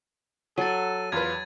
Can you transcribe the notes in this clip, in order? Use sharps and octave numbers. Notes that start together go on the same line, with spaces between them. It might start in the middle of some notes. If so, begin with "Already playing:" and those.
F#3 A4 G#5 A6 D#7
E2 F4 B4 G#6